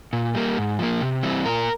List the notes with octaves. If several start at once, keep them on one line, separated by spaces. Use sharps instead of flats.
A#2
G3 A#3
G#2
F3 A#3
C3
E3 G3 C4
A#2 A#4